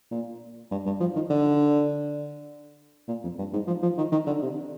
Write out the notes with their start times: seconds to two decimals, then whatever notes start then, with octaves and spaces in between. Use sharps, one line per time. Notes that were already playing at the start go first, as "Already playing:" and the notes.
0.12 A#2
0.71 G2
0.86 G2
1.00 F3
1.15 D#3
1.30 D3
3.08 A#2
3.23 F2
3.38 G2
3.53 G#2
3.67 F3
3.83 F3
3.98 D#3
4.12 D#3
4.27 D3
4.42 C3